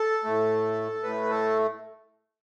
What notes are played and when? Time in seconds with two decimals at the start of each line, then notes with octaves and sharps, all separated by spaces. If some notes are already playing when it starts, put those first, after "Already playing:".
Already playing: A4
0.24 A2 A3
1.03 A2 A3 B4
1.30 A4